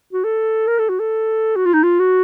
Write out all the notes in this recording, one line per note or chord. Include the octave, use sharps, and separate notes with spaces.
F#4
A4
A#4
A4
F#4
A4
F#4
F4
D#4
F4
F#4